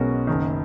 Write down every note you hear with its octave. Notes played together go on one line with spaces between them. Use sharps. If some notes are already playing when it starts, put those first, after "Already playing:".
Already playing: B1 B2 G#3 C#4 F#4 A#4
F#1 F#2 D#3